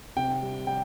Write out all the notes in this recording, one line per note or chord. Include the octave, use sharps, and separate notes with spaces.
C3 G5
G3
G3 G5